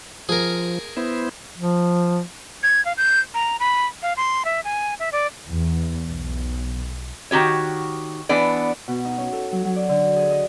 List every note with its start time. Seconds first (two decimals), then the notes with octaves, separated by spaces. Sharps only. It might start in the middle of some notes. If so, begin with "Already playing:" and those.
0.29 F3 G#4 A#4
0.97 B3 E4 C5
1.58 F3
2.63 G#6
2.85 F5
2.97 G6
3.34 A#5
3.60 B5
4.03 F5
4.17 C6
4.45 E5
4.64 G#5
5.00 E5
5.12 D5
5.47 E2
6.09 B1
7.31 D#3 F#4 G4 C#5
8.29 E3 B3 D4 D5
8.88 B2
9.05 D#4
9.18 C#4
9.33 A4
9.52 F#3
9.65 F#3
9.76 D5
9.89 D3
10.17 G#4
10.31 D#5